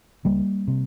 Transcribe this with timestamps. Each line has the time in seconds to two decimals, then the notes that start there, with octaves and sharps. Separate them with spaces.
0.25 C#2 G3 A#3
0.68 C3